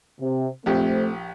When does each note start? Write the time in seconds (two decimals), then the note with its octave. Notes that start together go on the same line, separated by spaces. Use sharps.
0.21 C3
0.66 A#1 A3 C4 G4